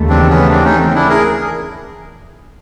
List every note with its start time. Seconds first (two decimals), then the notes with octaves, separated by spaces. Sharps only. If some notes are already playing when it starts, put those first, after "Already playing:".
Already playing: D#2 C#3 E3 A3
0.09 C4 D4
0.29 B3 C#4
0.50 C4 D4
0.65 C#4 D#4
0.80 C4
0.95 D4 E4
1.10 G#4 A#4